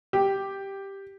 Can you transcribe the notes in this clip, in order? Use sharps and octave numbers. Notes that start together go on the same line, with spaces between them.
G4